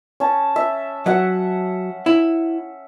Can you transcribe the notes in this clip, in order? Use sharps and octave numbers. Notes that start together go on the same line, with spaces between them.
C#4 A5
E5
F#3 E5 F#5
E4